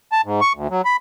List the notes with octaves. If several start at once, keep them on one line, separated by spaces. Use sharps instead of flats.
A5
G#2
C#6
D2
F#3
B5